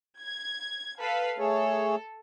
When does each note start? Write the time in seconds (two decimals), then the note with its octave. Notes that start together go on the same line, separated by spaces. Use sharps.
0.19 G#6
1.00 A4 B4 F5
1.38 A3 G#4 A4 C#5